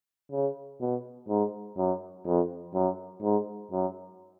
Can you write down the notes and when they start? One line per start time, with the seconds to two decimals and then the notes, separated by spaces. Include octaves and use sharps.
0.32 C#3
0.81 B2
1.29 G#2
1.77 F#2
2.26 F2
2.74 F#2
3.22 G#2
3.71 F#2